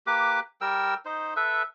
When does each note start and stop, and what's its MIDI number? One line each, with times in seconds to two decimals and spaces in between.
0.07 0.40 58
0.07 0.40 67
0.07 0.40 71
0.07 0.40 86
0.61 0.94 55
0.61 0.94 70
0.61 0.94 79
0.61 0.94 88
1.05 1.34 63
1.05 1.34 72
1.37 1.62 69
1.37 1.62 71
1.37 1.62 76